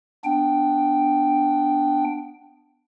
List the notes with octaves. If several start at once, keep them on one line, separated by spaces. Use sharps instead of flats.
B3 D4 G5